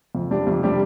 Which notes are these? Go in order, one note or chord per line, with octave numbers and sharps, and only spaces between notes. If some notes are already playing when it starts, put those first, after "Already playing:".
F2
C3 G3 D4 G4
F2
C3 G3 D4 G4